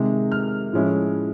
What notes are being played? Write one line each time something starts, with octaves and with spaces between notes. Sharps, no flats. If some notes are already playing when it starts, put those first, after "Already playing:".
Already playing: C3 D#3 G#3
F6
A2 F3 G#3 C#4 E4